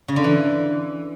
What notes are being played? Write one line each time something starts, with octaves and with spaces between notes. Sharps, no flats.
C#3
D3
E3